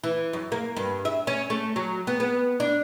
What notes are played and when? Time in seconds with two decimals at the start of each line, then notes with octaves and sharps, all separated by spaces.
0.04 E3
0.33 F#2
0.52 A#3
0.76 G2
1.05 E5
1.27 C#4
1.50 A3
1.76 F#3
2.07 B3
2.20 B3
2.60 D4